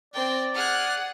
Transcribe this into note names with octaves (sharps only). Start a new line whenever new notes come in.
C4 D5 G5
G#4 F#5 F6 F#6